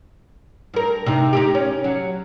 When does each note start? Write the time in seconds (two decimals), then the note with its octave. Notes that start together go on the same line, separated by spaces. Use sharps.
0.74 G2 A#4
1.06 C3 D#4
1.33 D#4 E4 G4
1.55 C#4
1.84 F#3